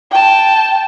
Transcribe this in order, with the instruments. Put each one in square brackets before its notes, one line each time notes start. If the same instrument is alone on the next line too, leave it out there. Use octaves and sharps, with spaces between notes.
[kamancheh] G5 A5